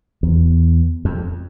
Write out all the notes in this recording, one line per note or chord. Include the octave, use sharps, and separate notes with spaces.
E2
F2